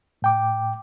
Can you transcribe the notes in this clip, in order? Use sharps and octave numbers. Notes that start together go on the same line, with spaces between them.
A2 G5 D6